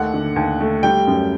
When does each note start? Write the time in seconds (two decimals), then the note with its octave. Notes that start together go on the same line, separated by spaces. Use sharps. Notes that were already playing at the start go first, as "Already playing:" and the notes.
Already playing: D#2 A3 F#5
0.14 D3
0.36 D#2
0.61 A3
0.83 G3 G5
1.07 F#2